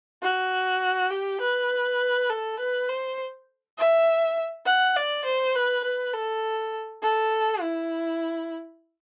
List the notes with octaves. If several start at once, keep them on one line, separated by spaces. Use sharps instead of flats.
F#4
G4
B4
A4
B4
C5
E5
F#5
D5
C5
B4
B4
A4
A4
E4